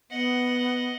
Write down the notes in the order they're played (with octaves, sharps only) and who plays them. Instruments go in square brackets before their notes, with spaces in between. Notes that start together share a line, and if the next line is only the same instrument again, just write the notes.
[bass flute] B3 [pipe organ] D#5 [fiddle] F#5